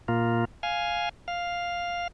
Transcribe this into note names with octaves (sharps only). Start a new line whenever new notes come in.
A#2 A#3 F4
F5 G#5
F5